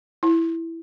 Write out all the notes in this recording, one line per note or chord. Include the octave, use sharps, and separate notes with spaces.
E4